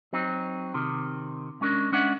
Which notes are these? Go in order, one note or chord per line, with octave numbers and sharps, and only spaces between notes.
F#3 C4 D#4
C3 D#3
G#3 C#4 D4 A#4
G#3 C#4 D4 D5 E5 F#5